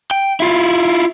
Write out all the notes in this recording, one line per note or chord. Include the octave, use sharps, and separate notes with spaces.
G5
E4 F4